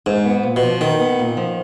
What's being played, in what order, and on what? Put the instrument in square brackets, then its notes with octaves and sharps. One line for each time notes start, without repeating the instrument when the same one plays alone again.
[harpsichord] G#2 [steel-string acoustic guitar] D#4
[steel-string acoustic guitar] B3
A#2
[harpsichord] B2
[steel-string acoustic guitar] F3
[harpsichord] D#3 [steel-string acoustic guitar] D#4
[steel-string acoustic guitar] B3
A#2
F3